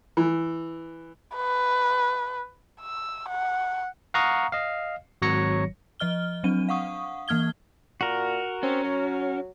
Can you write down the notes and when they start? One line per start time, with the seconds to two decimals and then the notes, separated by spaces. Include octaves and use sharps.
0.17 E3
1.36 B4
2.81 E6
3.29 F#5
4.14 F5 F#5 A#5 C#6 D#6
4.52 D#5 F5
5.22 G#1 F#3 C#5 A#6 C#7
6.00 F3 D#5 F6 G7
6.44 F#3 C4 D4 D#7
6.69 F5 F#5 C#6 D#6
7.28 E3 A#3 F6 G#6 G7
8.01 A#2 F#4 A#4
8.63 C4 C#4
8.84 F#3